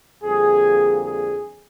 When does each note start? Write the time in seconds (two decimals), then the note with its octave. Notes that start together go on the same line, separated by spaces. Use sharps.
0.23 F2 D3 G3 A#3 G#4
1.04 G#4